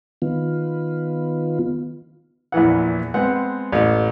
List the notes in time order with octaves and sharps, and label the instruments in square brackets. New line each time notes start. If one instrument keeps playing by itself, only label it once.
[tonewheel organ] D#3 B3 F4
[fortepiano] A#1 E2 E3 F#5
G#3 B3 C4 F#5
A1 A3